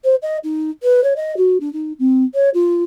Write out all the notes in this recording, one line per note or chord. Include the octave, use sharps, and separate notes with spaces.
C5
D#5
D#4
B4
C#5
D#5
F#4
D4
D#4
C4
C#5
F4